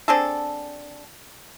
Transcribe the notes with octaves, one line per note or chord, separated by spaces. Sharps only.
C4 D4 G#4 A4